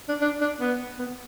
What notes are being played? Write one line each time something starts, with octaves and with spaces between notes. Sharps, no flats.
D4
D4
D4
B3
B3